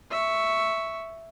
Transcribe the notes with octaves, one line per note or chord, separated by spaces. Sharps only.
E5 C#6